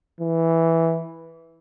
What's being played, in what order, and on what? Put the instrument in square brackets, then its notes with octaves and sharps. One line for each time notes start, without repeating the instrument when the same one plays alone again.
[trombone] E3